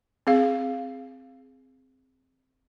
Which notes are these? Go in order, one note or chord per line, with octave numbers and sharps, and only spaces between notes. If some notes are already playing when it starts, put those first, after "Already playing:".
C4 G#4 F5